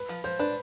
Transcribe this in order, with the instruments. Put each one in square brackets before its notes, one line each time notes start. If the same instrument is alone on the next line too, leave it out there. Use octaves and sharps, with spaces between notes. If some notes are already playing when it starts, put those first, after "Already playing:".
Already playing: [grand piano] B4
[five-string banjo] F3
[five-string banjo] F3 [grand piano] C5
[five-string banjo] D4 [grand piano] B4